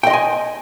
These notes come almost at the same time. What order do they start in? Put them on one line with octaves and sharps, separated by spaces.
G5 D#5 C6 G#5